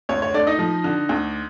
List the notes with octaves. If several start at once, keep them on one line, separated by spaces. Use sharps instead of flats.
D2 C#5
C#5
A3 D4 D5
D#4 D#5
F3
D3
D2